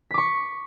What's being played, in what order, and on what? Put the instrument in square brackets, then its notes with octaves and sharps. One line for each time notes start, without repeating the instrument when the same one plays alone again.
[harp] B6
D6
C#6